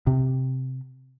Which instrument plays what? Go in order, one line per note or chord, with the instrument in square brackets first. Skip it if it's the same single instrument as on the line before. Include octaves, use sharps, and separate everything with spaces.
[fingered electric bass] C3